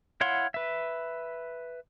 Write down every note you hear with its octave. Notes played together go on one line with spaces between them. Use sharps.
E4 C#5 F5 F#5 C6
B4 E5